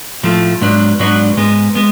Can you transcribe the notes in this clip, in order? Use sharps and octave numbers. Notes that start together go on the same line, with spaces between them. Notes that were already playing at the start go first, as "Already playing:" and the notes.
A2 F3 A3
G#2 F#3 B3 D4
G#2 F#3 B3 D4
G#2 G#3 B3
G#3 B3